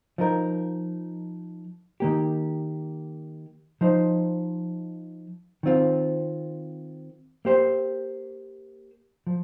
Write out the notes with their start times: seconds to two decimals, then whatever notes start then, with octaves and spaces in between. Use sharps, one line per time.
0.18 F3 D#4 A#4
2.00 D#3 A#3 G4
3.81 F3 D#4 C5
5.63 D#3 C4 F4
7.45 A#3 G4 C5
9.27 F3